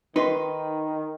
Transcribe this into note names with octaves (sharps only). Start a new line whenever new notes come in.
D#3 D#4 B4 D#5 C6